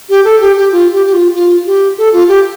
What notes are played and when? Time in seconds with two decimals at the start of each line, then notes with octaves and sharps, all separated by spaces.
0.10 G4
0.25 A4
0.41 G4
0.57 G4
0.72 F4
0.92 G4
1.06 G4
1.13 F4
1.35 F4
1.66 G4
1.98 A4
2.13 F4
2.28 G4